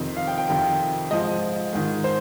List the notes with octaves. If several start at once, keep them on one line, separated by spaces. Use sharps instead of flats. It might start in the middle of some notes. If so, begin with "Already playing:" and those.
Already playing: F2 C3 D#3
F5
G5
G5
F2 C3 D#3 G5
G#2 F3 D#5
G#2 D#3
C5